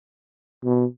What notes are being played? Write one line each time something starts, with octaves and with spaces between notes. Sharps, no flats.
B2